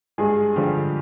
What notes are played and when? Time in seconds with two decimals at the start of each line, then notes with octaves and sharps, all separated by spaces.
0.18 G2 G#3 G#4
0.56 D3 F3 G3 G4